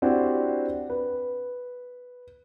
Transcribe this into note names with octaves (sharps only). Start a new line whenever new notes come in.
C4 D4 E4 F#4 G4 C5
B4